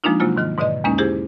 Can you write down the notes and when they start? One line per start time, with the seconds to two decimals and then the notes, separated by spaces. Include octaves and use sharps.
0.04 F3 G#3 A#3 D4 D#4 F4
0.20 C3 F#3 G#3 A#3 F4 F#4
0.36 G#2 D#3 F6
0.58 G#2 B2 D3 D5 D#5
0.84 E2 G#3 A#3 C#4 D#4
0.98 E4 G4 G#4 C5